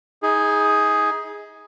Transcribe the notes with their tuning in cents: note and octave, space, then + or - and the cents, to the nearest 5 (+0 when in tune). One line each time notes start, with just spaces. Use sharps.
D#4 +35 G#4 +0